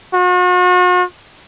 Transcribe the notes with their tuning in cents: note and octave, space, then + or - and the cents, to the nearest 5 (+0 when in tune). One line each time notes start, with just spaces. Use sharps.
F#4 -45